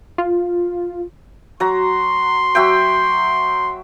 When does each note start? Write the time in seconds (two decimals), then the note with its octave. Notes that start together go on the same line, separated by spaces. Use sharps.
0.18 F4
1.60 F#3 A#5 C6
2.55 F#3 E5 G5